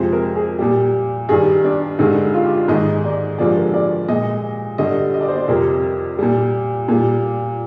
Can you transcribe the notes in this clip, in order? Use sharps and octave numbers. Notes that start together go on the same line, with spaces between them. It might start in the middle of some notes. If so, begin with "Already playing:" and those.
Already playing: F2 C3 F3 G#3 C5
A#4
G#4
A#2 G3 G4
G2 D#3 G3 G#4
D4
G2 D3 G#3 D#4
F4
G4
F4
G#2 D#3 G#3 D#5
D5
G2 D3 F3 G#3 D5
A#4
D5
A#2 G#3 D#5
G2 D3 G3 D#5
D#5
D5
C5
D5
F2 C3 G3 A#4
A#2 G3
A#2 G3